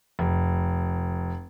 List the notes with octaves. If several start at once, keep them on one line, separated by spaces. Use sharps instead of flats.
F1